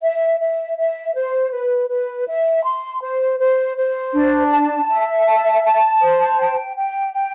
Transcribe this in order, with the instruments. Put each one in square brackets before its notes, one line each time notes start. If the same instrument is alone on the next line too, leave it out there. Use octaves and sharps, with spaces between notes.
[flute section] E5
E5
E5
C5
B4
B4
E5
C6
C5
C5
C5
D4
A5
E5
A5
A5
C5
G5
G5
G5